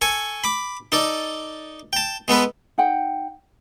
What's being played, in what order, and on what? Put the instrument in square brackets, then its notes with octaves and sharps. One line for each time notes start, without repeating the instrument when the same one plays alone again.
[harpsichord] A4 G#5 C#6
B5 D6
D#4 A4 D5
G5 A5
G#3 B3 A4 B4
[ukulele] D#4 F#5 G5